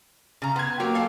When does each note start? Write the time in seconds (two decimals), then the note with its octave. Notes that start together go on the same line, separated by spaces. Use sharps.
0.42 C#3 A#5
0.56 B3 C6 G#6
0.80 F#3 A#3 G4
0.95 A4 F5 G#5